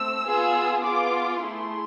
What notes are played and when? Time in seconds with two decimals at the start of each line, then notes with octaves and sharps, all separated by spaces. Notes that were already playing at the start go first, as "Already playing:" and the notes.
Already playing: A3 C4 E6
0.26 B3 F4 G#4
0.84 B3 F4 G#4 D6
1.41 A3 E4 G#4 C6